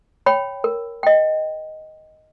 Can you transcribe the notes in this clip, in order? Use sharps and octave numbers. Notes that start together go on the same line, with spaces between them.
C#5 G5 B5
A#4
D#5 G5